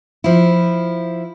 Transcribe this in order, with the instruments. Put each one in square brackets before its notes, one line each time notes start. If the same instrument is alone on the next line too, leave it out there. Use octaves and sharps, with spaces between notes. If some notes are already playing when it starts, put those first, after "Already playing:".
[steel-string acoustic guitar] F3 E4